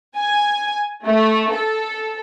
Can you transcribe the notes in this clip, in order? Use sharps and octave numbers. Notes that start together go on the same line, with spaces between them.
G#5
A3
A4